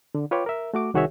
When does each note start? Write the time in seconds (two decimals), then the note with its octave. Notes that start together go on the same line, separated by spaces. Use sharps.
0.15 D3
0.31 F4 B4 C#5 G5 D6
0.46 A#4 E5
0.74 A3 F#4 D6
0.94 C2 D#3 F#4 G#4 C#5 E5